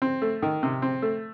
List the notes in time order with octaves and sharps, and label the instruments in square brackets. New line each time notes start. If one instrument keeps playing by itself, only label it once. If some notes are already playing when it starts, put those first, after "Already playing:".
[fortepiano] C4
A3
D#3
C3
C4
A3